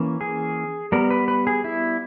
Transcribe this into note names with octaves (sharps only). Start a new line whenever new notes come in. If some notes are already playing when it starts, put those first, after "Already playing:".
Already playing: E3 A#3 C#4
G#4
G3 B3 A#4
B4
B4
G#4
E4